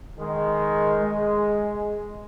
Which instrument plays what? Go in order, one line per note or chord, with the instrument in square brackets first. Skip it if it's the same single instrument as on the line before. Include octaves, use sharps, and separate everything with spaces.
[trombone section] D#3 G#3
G#3